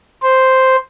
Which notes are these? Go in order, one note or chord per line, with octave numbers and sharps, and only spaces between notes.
C5